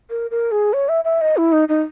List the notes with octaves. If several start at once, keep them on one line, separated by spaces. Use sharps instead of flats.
A#4
A#4
G#4
C#5
E5
E5
D#5
E4
D#4
D#4